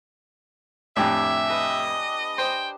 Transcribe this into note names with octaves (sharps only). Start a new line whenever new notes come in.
F2 A2 D4 G4 E5 G#5
B4 D#5
C5 G5